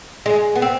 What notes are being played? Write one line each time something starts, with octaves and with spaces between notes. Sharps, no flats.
G#3
B3
C4